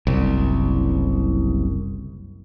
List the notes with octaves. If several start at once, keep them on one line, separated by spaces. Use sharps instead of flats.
F#1 C2